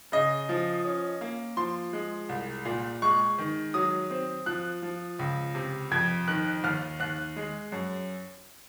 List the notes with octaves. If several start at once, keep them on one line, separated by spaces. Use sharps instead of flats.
C#3 D#5
F3
C#4
A#3
F3 C6
G#3
C2
A#2
G#3 C#6
D#3
F#3 D#6
C4
F3 F#6
F3
C#2
C3
F2 G#6
D#3 F#6
D#2 F6
D#2 F#6
G#3
F#2